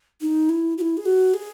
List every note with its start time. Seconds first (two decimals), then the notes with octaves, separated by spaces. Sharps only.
0.21 D#4
0.49 E4
0.78 F#4
0.81 E4
0.97 G#4
1.06 F#4
1.34 G#4